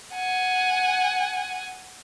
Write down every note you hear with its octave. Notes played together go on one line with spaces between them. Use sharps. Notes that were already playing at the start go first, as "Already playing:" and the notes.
F#5 G#5